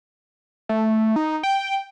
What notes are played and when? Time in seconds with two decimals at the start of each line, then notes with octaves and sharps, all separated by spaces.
0.69 A3
1.16 D#4
1.43 G5